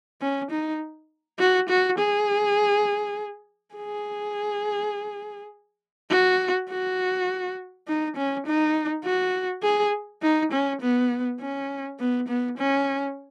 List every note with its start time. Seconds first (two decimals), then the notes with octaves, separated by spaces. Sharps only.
0.21 C#4
0.51 D#4
1.39 F#4
1.69 F#4
1.98 G#4
3.75 G#4
6.10 F#4
6.69 F#4
7.88 D#4
8.16 C#4
8.46 D#4
9.04 F#4
9.63 G#4
10.22 D#4
10.52 C#4
10.82 B3
11.40 C#4
11.99 B3
12.28 B3
12.58 C#4